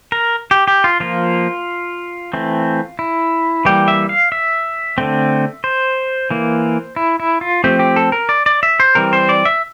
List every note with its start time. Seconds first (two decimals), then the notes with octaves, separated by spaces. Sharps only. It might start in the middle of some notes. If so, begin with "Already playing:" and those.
0.12 A#4
0.51 G4
0.68 G4
0.84 F4
1.00 F3 A#3 F4
2.33 E3 A3 C4
2.99 E4
3.65 E3 G3 A#3 G4
3.88 E5
4.09 F5
4.32 E5
4.98 D3 A3 C4
5.64 C5
6.31 E3 A#3
6.96 E4
7.20 E4
7.41 F4
7.64 F3 A3 C4 G4
7.79 G4
7.96 A4
8.12 A#4
8.29 D5
8.46 D5
8.63 E5
8.80 C5
8.95 E3 G3 C4 A#4
9.13 C5
9.29 D5
9.45 E5